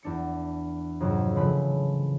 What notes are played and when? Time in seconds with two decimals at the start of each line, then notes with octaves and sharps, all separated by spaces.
0.03 E2 D4 C#7
1.00 F2 G#2 C3 F#3
1.35 C#3 E3 F3 A3 B4